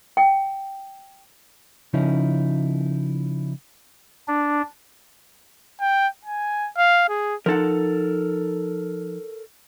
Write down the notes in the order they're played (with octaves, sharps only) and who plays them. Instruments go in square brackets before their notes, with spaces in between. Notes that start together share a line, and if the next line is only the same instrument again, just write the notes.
[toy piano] G5
[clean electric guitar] C#3 F3 C#4 D#4 E4
[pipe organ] D4
[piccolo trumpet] G5
G#5
F5
G#4
[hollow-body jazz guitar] F3 D#4 F#5 [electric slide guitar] A4 A#4